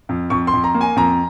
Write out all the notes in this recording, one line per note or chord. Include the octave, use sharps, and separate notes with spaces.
F2
F2 C#6
C6
F2
A#5
A#3
G#5
F2 A#5